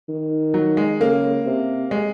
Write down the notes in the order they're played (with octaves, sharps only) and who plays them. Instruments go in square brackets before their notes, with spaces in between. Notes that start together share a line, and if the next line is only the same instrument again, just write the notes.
[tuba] D#3
[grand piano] F#3
G#3
[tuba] C#3 [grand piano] A#3
[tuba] C3
[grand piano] G#3